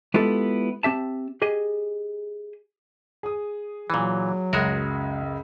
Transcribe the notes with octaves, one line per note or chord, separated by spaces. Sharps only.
G#3 B3 E4 F4 G4 A4
C4 G4 E5 A5
G4 G#4 D#5 G#5
G#4 D#6
A#2 E3 F#3
C#2 F#2 G#3 F#4 A#4